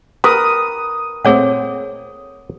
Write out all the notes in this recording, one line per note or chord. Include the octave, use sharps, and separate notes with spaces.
A#4 B4 D#6
A#2 A3 C4 G#4 C#5 F#5